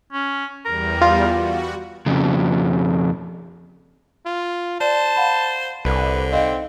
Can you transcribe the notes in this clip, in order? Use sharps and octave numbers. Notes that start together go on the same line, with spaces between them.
C#4
E2 G3 A#4
F4
F#4
F2 C#3
F4
C5 D5 A5
F5 F#5 B5
C2 D3 B4
C4 D#4 D#5 F5